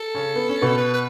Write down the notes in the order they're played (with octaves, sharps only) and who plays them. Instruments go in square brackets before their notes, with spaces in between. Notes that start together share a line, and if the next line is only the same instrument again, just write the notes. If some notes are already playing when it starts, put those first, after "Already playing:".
Already playing: [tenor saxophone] A4
[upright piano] C#3 C#4
B3
C#4
B2 B3
[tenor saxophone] B4
B4